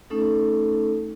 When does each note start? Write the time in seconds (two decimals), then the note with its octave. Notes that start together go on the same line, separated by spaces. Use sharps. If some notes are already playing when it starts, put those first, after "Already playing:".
0.10 A3 C#4 D#4 A4